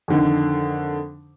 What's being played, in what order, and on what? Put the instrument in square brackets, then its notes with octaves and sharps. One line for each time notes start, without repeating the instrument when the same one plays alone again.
[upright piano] F2 D3 D#3